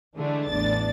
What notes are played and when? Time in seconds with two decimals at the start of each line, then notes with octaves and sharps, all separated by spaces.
0.17 D3 E3 G#3 A3 D4
0.50 A1 E2 D4 A6